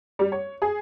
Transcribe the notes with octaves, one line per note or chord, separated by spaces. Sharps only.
G3
C#5
G#4